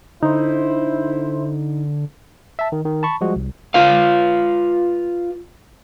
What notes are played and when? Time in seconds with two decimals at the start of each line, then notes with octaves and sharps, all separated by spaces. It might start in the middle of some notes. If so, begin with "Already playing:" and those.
0.23 D3 D#4 E4 C5
2.59 E5 A5
2.72 D#3
2.85 D#3
3.03 A5 B5 C#6
3.21 F3 G3 G#3 F#4
3.36 C2
3.74 F4 B4 F5